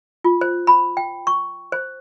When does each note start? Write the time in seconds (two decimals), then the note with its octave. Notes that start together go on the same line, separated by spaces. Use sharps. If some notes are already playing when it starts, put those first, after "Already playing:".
0.24 F4
0.41 C5
0.67 B5
0.97 G5
1.27 C#6
1.72 C5